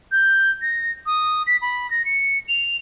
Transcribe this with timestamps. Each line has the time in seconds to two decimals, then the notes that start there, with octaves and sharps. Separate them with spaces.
0.12 G6
0.62 A#6
1.06 D#6
1.47 B6
1.62 B5
1.91 A#6
2.05 C#7
2.49 F7